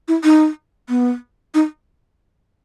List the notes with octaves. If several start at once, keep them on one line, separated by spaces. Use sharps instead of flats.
E4
D#4
B3
D#4